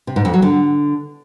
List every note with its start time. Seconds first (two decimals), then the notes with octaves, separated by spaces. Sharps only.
0.07 C3
0.16 G#2
0.25 F2
0.34 F#3
0.42 D3